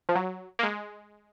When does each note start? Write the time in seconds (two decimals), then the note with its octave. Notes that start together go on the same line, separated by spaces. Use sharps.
0.09 F3
0.15 F#3
0.59 A#3
0.63 G#3